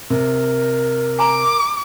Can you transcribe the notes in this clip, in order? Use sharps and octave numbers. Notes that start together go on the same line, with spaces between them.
C3 A#4
G#5 A#5 D6